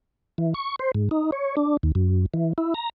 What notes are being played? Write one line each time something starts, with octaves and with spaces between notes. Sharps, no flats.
E3
C#6
C5
G#2
D#4
C#5
D4
D#2
F#2
E3
E4
A#5